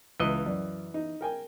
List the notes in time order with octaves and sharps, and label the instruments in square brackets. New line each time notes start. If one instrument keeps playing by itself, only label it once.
[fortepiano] C#2 [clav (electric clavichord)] E3 D#5
[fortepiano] F#2 D5
D#4
A#4 G5 G#5